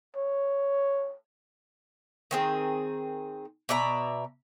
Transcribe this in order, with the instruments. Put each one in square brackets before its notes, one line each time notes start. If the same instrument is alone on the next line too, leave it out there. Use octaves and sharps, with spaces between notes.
[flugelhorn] C#5
[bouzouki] D#3 C4 G#4
B2 D5 E5 A#5